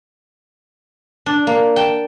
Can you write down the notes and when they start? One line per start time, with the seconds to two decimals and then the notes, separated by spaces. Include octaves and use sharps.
1.26 D4
1.47 A#3
1.76 G5 A5